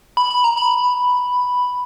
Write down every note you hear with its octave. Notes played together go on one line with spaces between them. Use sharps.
B5
B5
A#5
B5